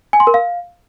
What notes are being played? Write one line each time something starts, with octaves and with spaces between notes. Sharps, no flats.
G#5
C6
A#4
F5